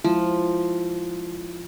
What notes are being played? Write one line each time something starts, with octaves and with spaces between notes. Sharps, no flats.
F3 G#3 E4